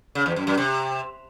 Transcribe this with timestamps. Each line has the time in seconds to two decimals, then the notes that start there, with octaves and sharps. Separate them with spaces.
0.15 C#3
0.26 E2
0.36 F#2
0.47 F#2
0.57 C3